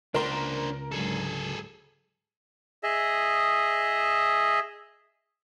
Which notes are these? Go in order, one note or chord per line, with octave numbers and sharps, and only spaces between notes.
C#2 D4 A#4 C5 C6
G#2 D3 F#3 G#4 A4
G#4 D#5 E5